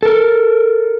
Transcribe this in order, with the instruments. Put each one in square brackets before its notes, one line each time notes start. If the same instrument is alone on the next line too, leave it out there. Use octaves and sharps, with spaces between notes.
[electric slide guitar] A4 A#4